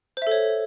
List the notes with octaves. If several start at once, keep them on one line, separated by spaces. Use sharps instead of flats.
A4 C5 C#5 E5